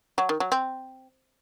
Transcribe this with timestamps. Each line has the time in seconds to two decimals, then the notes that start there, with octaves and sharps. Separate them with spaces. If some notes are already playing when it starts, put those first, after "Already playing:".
0.18 F#3
0.29 D#3
0.40 F#3
0.52 C4